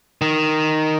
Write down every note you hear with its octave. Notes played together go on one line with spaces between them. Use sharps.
D#3